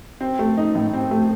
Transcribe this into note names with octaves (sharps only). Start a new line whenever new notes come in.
C4
A3
D#4
A2
C4
A3